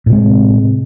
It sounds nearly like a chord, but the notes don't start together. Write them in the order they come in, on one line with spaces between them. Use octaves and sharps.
A2 C3 G#3